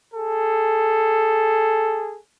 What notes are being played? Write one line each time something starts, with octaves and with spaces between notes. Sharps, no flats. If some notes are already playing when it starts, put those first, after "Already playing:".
G#4 A4